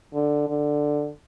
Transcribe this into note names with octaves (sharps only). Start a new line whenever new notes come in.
D3
D3